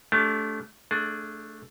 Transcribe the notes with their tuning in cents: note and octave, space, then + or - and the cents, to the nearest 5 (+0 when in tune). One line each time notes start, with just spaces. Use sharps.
A3 -15 D4 -35 G4 +0
A3 +0 D4 +0 G#4 +25